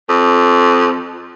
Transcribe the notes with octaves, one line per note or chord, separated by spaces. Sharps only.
F2